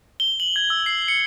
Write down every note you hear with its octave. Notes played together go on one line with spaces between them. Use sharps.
G7
F#7
G#6
E6
C7
C#7